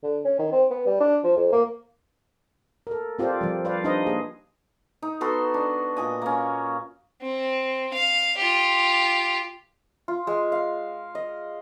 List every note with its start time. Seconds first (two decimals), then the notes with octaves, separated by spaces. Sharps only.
0.03 D3
0.25 C#4
0.39 D#3
0.52 C4
0.70 B3
0.86 G3
1.00 D4
1.24 F3
1.37 F2
1.52 A#3
2.87 A4 A#4
3.19 C4 F4 G4 A4 C5 D5
3.41 F3 G3
3.65 B4 C5 D5 F5
3.84 D4 D#4 B4 C5 D#5
4.06 A#3 G#4
5.02 D#4
5.21 B3 F#4 A4 C6
5.54 D4
5.97 A#2 D#5 G#5
6.22 A#3 C#4
7.22 C4
7.93 F5
8.38 F4 G4
10.08 F4
10.27 G#3
10.52 F5
11.15 D#5